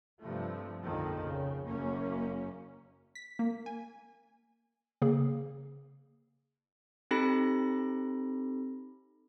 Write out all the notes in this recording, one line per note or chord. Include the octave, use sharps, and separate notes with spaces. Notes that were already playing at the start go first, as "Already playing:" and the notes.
G2 C3 F3 A3
A#1 F2 D3 D#3 F3
C#3
F#1 F#2 A#3 C#4
B6
A#3
G#5
C#3 A#3 G#4
C4 D#4 G4 A4 B5 A#6